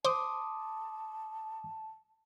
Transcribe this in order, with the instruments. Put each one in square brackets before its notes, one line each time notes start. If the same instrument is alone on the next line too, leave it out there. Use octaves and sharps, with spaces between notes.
[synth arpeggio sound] C5 [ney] A5 [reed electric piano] C6 D6 D#6